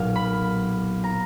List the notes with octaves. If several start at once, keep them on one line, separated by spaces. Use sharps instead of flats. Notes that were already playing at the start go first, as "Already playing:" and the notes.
Already playing: B1 A#2 F#3 A#3 F5
B5
A#5